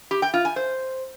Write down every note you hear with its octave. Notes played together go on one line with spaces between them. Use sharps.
G4
G5
F4
G#5
C5